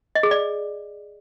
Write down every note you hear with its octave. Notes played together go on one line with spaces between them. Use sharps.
D#5
G#4
D5